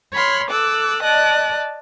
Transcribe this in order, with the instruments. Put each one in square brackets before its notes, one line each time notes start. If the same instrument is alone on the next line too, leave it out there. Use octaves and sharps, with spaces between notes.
[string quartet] C#5 B5 C6 F6
A4 D6 E6 F#6
D5 D#5 A5 F#6